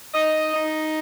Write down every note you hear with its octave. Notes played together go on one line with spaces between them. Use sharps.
D#4 D#5
D#4